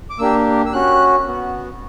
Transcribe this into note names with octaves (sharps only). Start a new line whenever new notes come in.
D6
A#3 D4 G4 E6
E6
C#4 F#4 F#6
B3 F#4